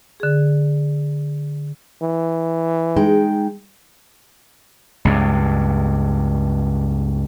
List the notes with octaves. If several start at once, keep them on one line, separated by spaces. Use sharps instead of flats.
D3 G#4
E3
G#3 D#4 G5
C#2 G2